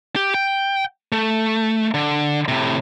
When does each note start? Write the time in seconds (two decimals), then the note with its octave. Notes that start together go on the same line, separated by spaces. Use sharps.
0.16 G4
0.34 G5
1.12 A3
1.94 D3
2.48 A2 C3